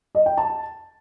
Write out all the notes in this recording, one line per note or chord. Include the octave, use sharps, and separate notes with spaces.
D#5
G5
A5